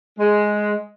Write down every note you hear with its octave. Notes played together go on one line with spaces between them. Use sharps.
G#3